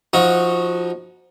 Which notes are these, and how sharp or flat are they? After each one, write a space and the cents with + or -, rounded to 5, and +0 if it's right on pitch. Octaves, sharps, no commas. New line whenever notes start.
F3 +0 D#4 +20 F#4 -10